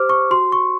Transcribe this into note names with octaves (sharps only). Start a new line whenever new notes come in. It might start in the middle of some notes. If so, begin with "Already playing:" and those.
Already playing: G4 C5 D6 F6
C#6
F#4 C6
C#6